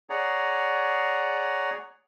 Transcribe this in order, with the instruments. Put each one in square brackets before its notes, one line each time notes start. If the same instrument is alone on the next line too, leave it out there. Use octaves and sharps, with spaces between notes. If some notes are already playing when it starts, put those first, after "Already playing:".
[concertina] G#4 C#5 D5 F#5 A#5